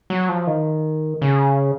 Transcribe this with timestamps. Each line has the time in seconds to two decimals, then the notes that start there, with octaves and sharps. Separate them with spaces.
0.10 F#3
0.29 F3
0.47 D#3
1.22 C#3